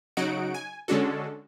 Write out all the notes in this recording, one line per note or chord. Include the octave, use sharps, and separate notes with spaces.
C#3 F#3 D#4 F#4 F#5 D7
G#5
D3 G#3 C#4 D4 F#4 A4